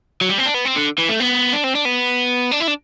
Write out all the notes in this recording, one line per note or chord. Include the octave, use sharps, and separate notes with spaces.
F#3
G3
C4
D4
B3
C4
D3
E3
A3
B3
D4
C4
D4
B3
D4
E4
D4